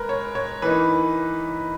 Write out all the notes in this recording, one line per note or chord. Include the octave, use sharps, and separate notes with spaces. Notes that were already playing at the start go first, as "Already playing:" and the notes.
Already playing: G#3 A#4 B4
C#5
C#5
E3 A#3 D#4 B4